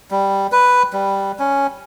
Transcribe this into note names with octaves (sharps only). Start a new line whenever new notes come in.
G3
B4
G3
C#4